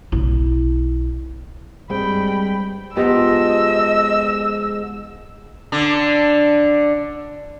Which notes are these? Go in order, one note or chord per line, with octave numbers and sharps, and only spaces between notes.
B1 E4
G2 G3 G#3 C4 G5 B5
G#2 F3 B3 G4 A4 D#5 E6
D3 D4